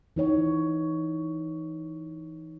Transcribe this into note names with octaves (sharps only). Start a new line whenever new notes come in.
E3 D#4 C#5